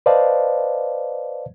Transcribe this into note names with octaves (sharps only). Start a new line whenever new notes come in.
B4 C5 D5 D#5 F5 A5